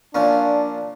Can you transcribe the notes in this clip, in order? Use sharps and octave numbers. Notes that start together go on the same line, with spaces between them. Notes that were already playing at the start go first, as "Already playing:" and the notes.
A#2 F3 C#4 D4